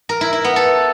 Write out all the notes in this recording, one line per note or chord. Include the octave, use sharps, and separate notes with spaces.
A#4
E4
E4
B3
A4